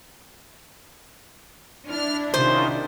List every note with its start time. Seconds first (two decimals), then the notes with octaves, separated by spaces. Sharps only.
1.88 D4 E4 F6
2.34 C3 D#3 C#4 D#4 F4 C5